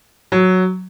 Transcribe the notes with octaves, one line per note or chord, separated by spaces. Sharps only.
F#3